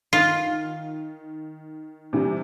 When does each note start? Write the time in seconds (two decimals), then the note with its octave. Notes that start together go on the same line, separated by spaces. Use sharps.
0.13 D#3 F4
2.13 C3 E3 G3